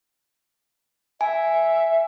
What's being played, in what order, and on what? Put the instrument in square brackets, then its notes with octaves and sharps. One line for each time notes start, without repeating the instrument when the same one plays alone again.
[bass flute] E5 [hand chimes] G#5